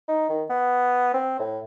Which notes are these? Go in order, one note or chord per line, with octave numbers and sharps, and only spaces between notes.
D#4
D#3
B3
C4
A2